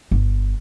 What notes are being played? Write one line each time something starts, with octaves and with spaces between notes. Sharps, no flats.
G1